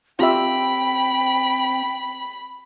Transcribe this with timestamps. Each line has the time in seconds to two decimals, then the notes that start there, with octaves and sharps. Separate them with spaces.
0.19 C4 F4 G4 E5 G5 B5